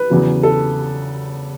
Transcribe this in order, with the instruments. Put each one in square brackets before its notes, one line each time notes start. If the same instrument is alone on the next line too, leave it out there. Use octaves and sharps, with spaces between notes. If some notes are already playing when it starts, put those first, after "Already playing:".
Already playing: [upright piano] B4
E2 C#3 F#3
A4